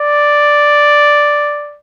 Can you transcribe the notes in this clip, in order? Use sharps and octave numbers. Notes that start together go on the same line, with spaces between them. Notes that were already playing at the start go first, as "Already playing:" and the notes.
Already playing: D5